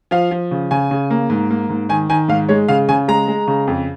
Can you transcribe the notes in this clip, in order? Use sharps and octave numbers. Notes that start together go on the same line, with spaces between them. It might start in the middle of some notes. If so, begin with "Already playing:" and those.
F3 F5
F3
C#3
C#3 G#5
C#3
A#3
G#2
A#3
G#2
D#3 G#5
D#3 G#5
G#2 F5
G#3 C#5
C#3 F5
C#3 G#5
G#3 A#5
G#3
C#3
F2